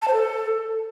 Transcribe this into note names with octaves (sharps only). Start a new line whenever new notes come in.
A5
C5
A4